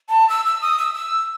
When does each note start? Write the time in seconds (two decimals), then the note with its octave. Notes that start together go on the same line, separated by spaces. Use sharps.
0.09 A5
0.29 E6
0.46 E6
0.62 D#6
0.78 E6
0.94 E6